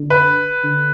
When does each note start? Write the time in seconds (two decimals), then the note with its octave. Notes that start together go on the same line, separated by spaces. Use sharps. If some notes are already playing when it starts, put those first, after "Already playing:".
Already playing: D3
0.10 B4
0.64 D3